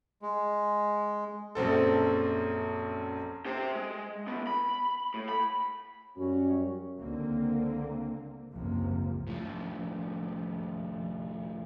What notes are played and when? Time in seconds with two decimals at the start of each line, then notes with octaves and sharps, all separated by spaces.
0.22 G#3
1.55 A#1 F#2 C4 A4
3.46 G4 C5
3.75 G#3
4.27 D#2 B3
4.47 B5
5.14 A2
5.29 B5
6.17 F#2 G3 C#4 F#4
6.99 C#2 D3 A#3 C4
8.52 F#1 C#2 G#2 C3 F3 A#3
9.27 A2 F3